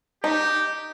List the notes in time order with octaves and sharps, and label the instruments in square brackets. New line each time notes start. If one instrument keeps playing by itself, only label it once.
[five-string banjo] D#4 [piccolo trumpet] G4